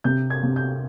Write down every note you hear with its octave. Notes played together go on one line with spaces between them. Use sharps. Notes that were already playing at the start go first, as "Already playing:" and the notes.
C3 G6
G#6
C3
G6